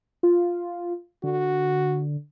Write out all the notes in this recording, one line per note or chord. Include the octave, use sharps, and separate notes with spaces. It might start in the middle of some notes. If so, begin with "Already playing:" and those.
F4
D3 F#4